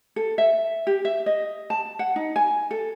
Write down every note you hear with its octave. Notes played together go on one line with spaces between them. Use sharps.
A4
E5
G4
E5
D#5
A5
F#5
D#4
G#5
A4